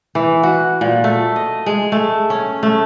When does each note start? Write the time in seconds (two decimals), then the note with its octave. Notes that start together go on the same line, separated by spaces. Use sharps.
0.15 E3
0.43 F#4
0.81 A#2
1.04 A3
1.36 D#5
1.66 G#3
1.92 A3
2.30 C#4
2.63 A3